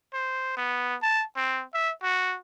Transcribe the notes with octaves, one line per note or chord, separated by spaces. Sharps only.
C5
B3
A5
C4
E5
F#4